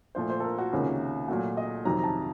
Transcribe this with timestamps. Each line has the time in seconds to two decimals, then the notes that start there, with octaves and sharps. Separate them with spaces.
0.15 A#2 F3 A3 C5
0.30 C5
0.40 A4
0.44 A#4
0.58 F#4
0.73 C#2 C3 D#3 A#3 C#4
1.28 A#2 F#3 A3 F#4
1.57 D#5
1.85 F2 C3 D#3 F#3 A#5
1.99 A#5
2.04 A5